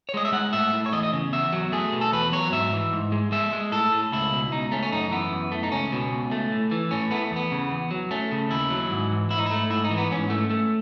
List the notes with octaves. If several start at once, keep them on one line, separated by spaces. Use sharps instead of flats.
C#5
G#3 D#5
E5
G#3 F#5
A2 E5
A2
C#5
E2 D#5
D#5
C#3
E2 E5
F#3
A3 G#4
B2
A4
E2 B4
F#3 C#5
G#2 E5
E3
G#2
G#3
G#3 E5
G#3
A2 A4
A2
C#2 E4
B2
C#2 D#4
A3 C#4
C#4
F#2 D#4
E3 B3
F#2
A3
D#4
C#2 C#4
B2
C#2
A3
A2
E3
A2 C#4
A3 B3
E2 B3
C#3
E2
F#3
A3 C#4
C#3
D#2 E4
F#3
G#2
E3
G#2 E4
D#4
E4
A3
G#2 E4
D#4
E3
B3
G#2 C#4
A3
A3